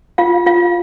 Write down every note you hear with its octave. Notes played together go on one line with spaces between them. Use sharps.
F4 F5
F4 F5